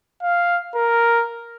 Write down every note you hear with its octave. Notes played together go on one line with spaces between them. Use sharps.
F5
A#4